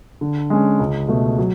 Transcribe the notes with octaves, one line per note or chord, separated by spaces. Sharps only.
D3
G#3 C#4
C#2
B2 A3
F#3